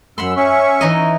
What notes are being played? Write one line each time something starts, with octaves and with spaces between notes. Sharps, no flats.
F#2 F#5 B5 C6 E6
C#4 E5 C#6
E3 D#4 D#5